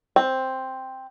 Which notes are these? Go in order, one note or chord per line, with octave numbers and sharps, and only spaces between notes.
C4